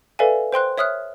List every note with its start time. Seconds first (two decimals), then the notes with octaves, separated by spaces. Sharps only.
0.19 A4 B4 D5 E5 F5 G#5
0.52 C5 G5 C6 F#6
0.78 C#5 E5 D#6 F6 F#6